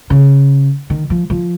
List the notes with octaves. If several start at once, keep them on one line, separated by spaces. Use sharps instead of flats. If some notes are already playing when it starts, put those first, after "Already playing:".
C#3
D#3
F3
F3